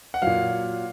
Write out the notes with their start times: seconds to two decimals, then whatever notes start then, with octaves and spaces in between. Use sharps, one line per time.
0.14 F#5
0.22 A#2 F#3 F5